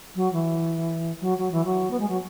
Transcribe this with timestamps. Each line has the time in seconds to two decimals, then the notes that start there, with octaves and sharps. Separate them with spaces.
0.15 F#3
0.33 E3
1.20 F#3
1.38 F#3
1.51 E3
1.64 F#3
1.90 B3
1.99 G#3
2.08 F#3